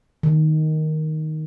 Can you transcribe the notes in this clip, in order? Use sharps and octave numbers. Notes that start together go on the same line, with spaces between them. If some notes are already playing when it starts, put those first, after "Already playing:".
D#3